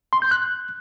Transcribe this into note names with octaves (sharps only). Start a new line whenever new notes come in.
C6
G6
F#6